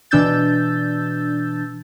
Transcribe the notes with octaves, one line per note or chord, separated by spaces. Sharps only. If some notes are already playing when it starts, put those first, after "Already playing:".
B2 E3 D4 E6 G6 A6